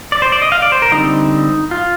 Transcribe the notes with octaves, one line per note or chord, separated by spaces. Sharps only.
D5
C5
D5
D#5
F5
D5
C5
A#4
D3 G3 C4 D#4
F4